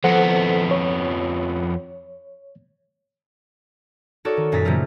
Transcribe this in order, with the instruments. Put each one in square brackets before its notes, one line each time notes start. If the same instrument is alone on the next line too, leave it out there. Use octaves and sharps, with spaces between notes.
[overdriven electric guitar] F2 B3 [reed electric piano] A4 C5 F#5
[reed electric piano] C#5
[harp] D#4 F#4 A4 A#4 C#5 D5
D#3
F#2 A#2 D#4 A#5 A6 B6
A#2 C#3 F3 G3 A3 A#4